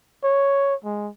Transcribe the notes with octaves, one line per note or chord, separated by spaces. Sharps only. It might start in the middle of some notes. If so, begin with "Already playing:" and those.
C#5
G#3